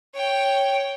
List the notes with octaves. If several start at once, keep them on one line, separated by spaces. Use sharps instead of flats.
C#5 G5